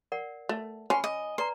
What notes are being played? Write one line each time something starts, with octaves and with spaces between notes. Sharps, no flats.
A#4 D5 F#5
A3
C#4 G#5 B5 C6
D#5
B4 D5 A#5 C6